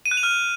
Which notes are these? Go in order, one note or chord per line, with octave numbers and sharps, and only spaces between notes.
D#7
F#6
F7
F6